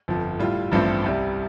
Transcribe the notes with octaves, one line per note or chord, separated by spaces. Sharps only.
G1 F2 F3
A2 G3 F4
A1 G2 F3 A3 C4
C2 C3 G3